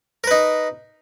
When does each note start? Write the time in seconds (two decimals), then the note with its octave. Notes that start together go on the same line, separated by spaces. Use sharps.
0.24 A#4
0.27 B4
0.31 D#4